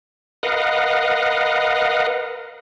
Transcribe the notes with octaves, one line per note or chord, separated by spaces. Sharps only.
A#4 B4 D#5 F5 F#5